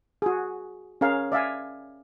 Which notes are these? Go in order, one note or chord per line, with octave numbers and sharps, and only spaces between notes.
F#4 G#4
C#4 G#4 A#4 F5
D5 E5 F5 G#5